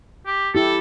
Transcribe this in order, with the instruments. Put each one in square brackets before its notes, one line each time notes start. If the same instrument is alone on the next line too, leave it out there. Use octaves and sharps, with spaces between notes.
[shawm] G4
[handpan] E4 G4 [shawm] A4